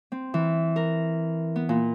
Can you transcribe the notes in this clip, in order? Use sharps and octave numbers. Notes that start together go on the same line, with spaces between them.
C4
E3
A#4
B3
A#2